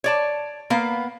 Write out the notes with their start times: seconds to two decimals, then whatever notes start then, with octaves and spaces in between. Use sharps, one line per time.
0.04 C#5 D5 A5
0.70 A#3 B3 F5